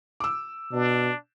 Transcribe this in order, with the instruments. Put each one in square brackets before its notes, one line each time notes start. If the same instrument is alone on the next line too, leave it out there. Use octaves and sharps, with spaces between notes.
[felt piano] D6 E6
[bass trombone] B2 [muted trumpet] D4